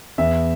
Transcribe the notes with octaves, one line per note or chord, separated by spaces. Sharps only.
E2 E5